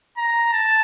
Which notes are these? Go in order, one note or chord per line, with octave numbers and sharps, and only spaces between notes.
A#5
A5